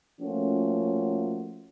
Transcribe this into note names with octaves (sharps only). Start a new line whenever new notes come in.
F3 A3 A#3 C#4 F4 F#4